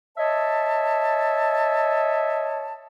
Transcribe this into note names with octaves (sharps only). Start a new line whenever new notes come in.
C#5 D#5 E5 A5